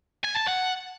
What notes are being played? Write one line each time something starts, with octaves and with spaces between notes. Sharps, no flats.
G#5
A5
F#5